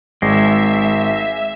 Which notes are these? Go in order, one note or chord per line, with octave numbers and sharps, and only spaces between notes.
G#1 G#3 E5